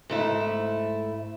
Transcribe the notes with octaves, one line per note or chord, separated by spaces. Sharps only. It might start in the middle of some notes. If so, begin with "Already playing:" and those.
G#2 A3 E4